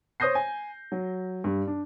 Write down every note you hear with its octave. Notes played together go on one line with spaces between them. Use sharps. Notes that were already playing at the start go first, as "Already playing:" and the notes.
C5 C#5 D#6 G6 A#6 C7
G#5
F#3
G2
D4